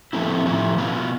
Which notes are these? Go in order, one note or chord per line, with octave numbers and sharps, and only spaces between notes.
A2 F3 A3 C4 E4
A2 F3 A3 E4
B2 B3 F4